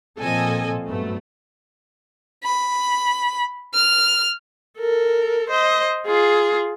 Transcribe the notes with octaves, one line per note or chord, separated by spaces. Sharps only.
A#2 F3 C4 A4 D#5 G#5
G2 F#3 A3 B3
B5
F6
A4 A#4
C5 D#5
F4 G#4